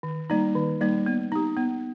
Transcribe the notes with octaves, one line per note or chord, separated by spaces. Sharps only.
D#3
G3 A#3 D#4
D#3
G3 A#3 D#4
B3
D#4 G4
B3